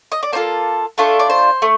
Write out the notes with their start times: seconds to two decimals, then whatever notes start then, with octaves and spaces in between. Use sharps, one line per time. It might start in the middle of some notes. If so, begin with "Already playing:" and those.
0.12 D#5
0.23 D5
0.32 A#3 D4 F4 A4 C5
0.98 A3 D4 F4 A4
1.19 D5
1.30 C5
1.62 A3